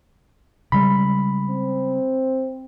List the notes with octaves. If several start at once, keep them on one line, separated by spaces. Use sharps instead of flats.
C#3 G3 G#3 B5
C4